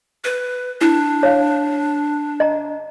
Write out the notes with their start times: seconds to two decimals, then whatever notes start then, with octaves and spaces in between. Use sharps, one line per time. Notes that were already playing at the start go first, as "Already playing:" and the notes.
0.24 B4
0.81 D4 E4
1.23 C#5 F5
2.40 D#5 A#5